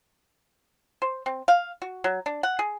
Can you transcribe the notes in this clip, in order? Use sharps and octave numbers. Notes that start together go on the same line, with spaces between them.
C5
C4
F5
F#4
F#3
D4
F#5
G#4